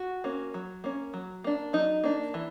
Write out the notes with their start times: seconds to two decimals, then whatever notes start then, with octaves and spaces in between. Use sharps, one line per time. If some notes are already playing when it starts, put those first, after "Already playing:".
Already playing: F#4
0.24 A#3 C#4
0.54 F#3
0.84 A#3 C#4
1.14 F#3
1.44 A#3 D4
1.73 F#3 D#4
2.04 A#3 D4
2.34 E3